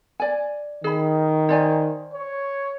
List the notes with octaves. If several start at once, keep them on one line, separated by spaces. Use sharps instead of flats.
D5 G#5
D#3 G#4 B5
C5 D5 G#5
C#5